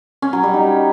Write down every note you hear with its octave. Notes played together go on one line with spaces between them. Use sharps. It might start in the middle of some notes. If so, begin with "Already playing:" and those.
C#4
F#3
G3
D#4